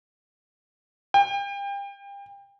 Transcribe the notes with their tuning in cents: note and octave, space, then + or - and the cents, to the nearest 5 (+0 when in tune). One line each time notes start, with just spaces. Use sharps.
G5 +30